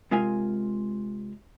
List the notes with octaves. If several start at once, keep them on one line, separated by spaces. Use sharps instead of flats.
C3 G#3 F4 A#4 G#5